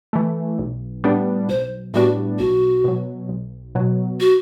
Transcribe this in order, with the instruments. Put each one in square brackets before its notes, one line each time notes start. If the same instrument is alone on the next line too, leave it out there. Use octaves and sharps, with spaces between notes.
[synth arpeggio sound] E3 A3
B1
A2 G3 B3 D4
[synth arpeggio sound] B1 [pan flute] C5
[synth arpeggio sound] A2 G3 B3 D4 [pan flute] F#4
[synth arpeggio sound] B1 [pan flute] F#4
[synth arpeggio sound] B2 F#3
B1
B2 F#3
[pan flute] F#4